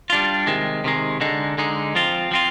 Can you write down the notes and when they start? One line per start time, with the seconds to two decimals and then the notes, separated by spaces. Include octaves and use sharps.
0.10 G3 D4 F4
0.47 C3 D#3 G#3
0.84 C3 D#3 G#3
1.21 D3 G#3 D#4
1.58 D3 G#3 D#4
1.95 F3 C4 F4
2.31 F3 C4 F4